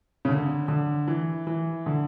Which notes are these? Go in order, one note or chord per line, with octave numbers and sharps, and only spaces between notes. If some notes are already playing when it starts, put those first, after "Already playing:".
C#3
D3
D3
E3
E3
D3